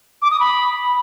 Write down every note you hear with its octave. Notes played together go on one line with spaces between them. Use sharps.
D6
D#6
B5